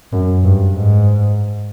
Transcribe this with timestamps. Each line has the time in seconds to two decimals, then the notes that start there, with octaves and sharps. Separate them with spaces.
0.13 F#2
0.44 G2
0.75 G#2